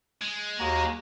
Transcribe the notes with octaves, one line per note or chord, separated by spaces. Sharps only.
G#3
D#2 F#4 A#5